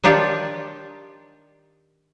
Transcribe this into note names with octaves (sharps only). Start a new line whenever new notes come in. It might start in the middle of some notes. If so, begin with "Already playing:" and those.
D#3 D4 F4 G4 C#5